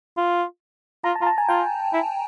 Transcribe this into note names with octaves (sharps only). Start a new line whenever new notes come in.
F4
F4 A#5
A5
F4 A#5
A5
G#5
F4 G5
E4